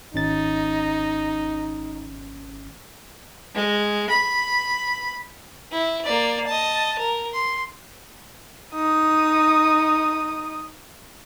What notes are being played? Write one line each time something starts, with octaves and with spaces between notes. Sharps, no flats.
G#1 C#4 D#4 A6
G#3
B5
E4
A#3 D5
D#5 A5
A#4
C6
D#4 D#6